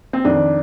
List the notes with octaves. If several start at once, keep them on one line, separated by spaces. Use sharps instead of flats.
C4
F2 D#3 D4